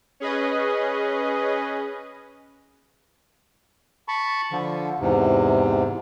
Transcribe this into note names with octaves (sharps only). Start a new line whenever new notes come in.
C#4 G#4 B4 D#5
A5 B5 C#6
D3 F3
E2 G#2 C3